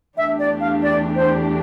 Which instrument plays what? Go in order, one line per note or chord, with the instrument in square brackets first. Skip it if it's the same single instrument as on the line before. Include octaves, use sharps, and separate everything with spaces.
[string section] E2 E3 A3 D4 G4 [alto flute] E5
[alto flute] D5
F5
D5
C5